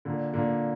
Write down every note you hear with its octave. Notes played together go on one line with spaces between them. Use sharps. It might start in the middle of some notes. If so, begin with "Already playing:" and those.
A#2 D3
A#2 D3